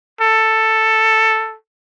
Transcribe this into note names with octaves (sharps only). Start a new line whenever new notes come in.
A4